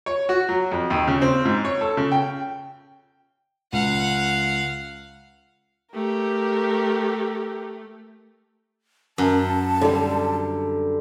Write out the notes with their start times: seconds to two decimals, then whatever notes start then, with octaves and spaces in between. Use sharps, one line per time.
0.06 C#5
0.29 F#4
0.49 F#3
0.71 F2
0.90 D#2
1.07 C#3
1.22 C4
1.45 G#2
1.65 C#5
1.81 A4
1.97 C#3
2.12 G5
3.73 C#2 F5 F#5
5.93 A3 G4 A#4
9.18 F#2 A5
9.81 D3 G3